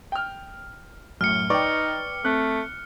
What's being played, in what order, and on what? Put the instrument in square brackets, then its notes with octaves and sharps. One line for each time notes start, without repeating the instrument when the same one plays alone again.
[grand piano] G5 F6
[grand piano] F#2 A2 [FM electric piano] F#3 [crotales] F6 C#7
[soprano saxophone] D#4 [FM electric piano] B4 G5 [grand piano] D5 C#6 D6
[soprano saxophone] A3 [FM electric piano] C4 [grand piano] F#6